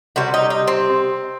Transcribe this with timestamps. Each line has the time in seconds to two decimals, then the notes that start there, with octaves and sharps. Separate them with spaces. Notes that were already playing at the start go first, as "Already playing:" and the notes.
0.16 C3 G3 F#4
0.34 D#4
0.50 D#4
0.68 C4